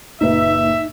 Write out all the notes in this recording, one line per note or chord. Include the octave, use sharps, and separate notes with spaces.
F#1 A#2 D#4 B4 E5